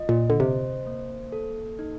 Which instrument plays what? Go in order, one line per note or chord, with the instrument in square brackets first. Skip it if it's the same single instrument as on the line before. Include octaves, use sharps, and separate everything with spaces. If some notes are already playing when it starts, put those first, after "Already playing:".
Already playing: [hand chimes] F4 D#5
[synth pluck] A#2
D3
[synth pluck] C3 [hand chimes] C5
[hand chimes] A#3
A4
D#4